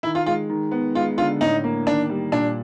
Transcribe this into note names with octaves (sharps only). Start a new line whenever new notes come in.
D#3 E4
F4
G#3 F4
D#3
B3
G#3 F4
D3 F4
A2 D#4
A#3
D#3 D4
G3
A#2 D4